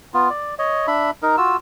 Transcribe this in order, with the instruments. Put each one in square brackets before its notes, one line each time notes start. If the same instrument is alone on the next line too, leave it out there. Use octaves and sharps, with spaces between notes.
[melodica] B3 F4
D5
C#5 D#5
D4 E5 B5
D#4 A#4
F4 F#4 E6